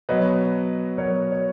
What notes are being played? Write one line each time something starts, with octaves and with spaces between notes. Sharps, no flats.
B2 F#3 B4 D#5
B2 F#3 A#4 C#5
C#5